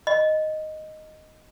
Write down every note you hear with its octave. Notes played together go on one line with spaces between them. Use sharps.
D#5